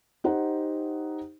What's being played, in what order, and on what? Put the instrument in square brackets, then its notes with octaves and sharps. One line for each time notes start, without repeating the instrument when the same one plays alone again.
[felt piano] D#4 G4 C5 F#5